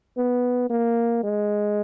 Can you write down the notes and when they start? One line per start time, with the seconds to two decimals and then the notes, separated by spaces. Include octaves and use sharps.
0.17 B3
0.70 A#3
1.23 G#3